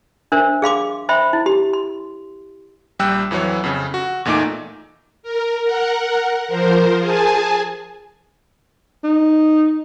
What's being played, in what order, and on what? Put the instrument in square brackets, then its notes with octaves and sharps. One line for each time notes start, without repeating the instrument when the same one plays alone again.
[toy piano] D4 A#4 C5 E5
G#4 F5 C6 D6
C5 E5 G5 B5 C6
E4
G4 C6
C6
[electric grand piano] A#1 G3 G5 E6 F#6
F2 E3 F#3 C#5
F2 C#3
F#4
E2 A#2 A3 D#4 D6 D7
[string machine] A#4
A#4 F#5
F3 A#4 C5
G#4 G#5 A5
[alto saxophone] D#4